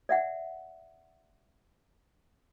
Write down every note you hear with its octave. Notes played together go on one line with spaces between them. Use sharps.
D5 E5 F#5